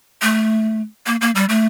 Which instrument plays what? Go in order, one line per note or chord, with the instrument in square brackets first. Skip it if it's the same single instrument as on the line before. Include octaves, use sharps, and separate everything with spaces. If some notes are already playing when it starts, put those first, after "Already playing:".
[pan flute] A3
A#3
A#3
G3
A3